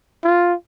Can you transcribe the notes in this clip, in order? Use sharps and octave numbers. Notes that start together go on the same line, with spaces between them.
F4